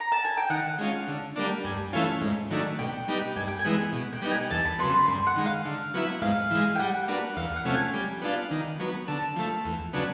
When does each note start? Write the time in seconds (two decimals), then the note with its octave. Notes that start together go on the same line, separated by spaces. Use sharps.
0.00 A#5
0.12 A5
0.25 G#5
0.37 G5
0.50 D#3 F#5
0.78 G#3 C#4 F4
1.08 D3
1.36 G3 A#3 D4
1.64 G2 G#5
1.93 E3 A3 C#4 F4
2.21 G#2
2.51 D#3 F#3 A3 D4
2.79 B2 G5
3.08 G3 B3 D#4 G4
3.36 G2 G#5
3.48 G5
3.59 G#5
3.65 E3 G#3 B3
3.93 B2
4.13 G5
4.22 G3 B3 D#4
4.31 G#5
4.50 E2 A5
4.65 B5
4.79 C#3 F#3 B3 C6
4.94 B5
5.08 G2 C6
5.27 F#5
5.36 D#3 G#3
5.46 F5
5.65 D3
5.94 F#3 B3 E4
6.21 G#2 F5
6.50 E3 G#3
6.75 G5
6.79 G3 F#5
7.08 A#3 D4 F#4 B4
7.36 E2 F5
7.56 F#5
7.65 C3 F3 A3 C#4
7.75 G#5
7.93 G3
8.22 B3 D4 F4
8.51 D#3
8.79 F#3 B3
9.08 D3 A5
9.36 F3 A3
9.65 E2
9.93 C#3 F#3 B3 D4